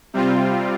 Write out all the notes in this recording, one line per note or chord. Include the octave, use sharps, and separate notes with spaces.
C3 G3 C4 F4